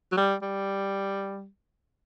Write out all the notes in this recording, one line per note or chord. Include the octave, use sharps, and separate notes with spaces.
F#3
G3
G3